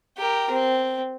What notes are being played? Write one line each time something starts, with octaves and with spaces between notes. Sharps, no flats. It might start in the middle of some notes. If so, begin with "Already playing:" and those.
G4 A#4
C4